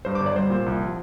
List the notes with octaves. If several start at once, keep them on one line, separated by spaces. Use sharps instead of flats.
G2 C5
D6
G1
D5
G3 C5
A#2
C2
F3